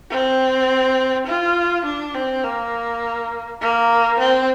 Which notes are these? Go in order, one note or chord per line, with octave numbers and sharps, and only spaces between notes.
C4
F4
D4
C4
A#3
A#3
C4